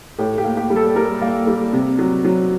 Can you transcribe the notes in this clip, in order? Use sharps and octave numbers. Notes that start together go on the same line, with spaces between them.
A2 G4
G4
A#3
G4
G3
A4
G3 A#4
A#3
G3
C3
F#3
F#3